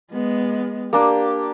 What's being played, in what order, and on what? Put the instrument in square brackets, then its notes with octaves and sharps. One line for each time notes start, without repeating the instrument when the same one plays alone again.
[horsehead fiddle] G#3 B3
[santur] A#3 D4 [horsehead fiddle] G4